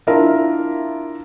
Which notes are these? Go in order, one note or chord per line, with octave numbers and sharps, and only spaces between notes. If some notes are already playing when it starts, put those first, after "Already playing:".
D4 E4 F4 A#4 E5 F5